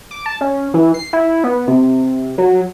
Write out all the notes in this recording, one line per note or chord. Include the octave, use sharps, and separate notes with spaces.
D6
A5
C#4
E3
C7
E4
B3
C3
F#3